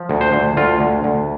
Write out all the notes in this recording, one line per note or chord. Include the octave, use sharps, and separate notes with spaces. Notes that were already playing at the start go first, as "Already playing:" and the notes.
Already playing: F3
D2
C5
D2
D2 F4
D2
D2